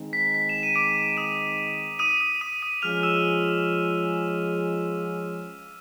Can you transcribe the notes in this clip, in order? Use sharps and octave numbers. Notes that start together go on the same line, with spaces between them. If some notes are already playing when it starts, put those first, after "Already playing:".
Already playing: D#3 G#3 C4 D#4
B6
B6
E7
D#7
D6 D7
D#6 D#7
D#6 D#7
D#6 D#7
D#6 D#7
D#6 D#7
F3 G#3 C#4 F4 G#4 F6 F7
E6 E7